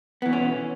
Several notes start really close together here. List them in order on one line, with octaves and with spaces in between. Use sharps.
B3 E3 B2 C#4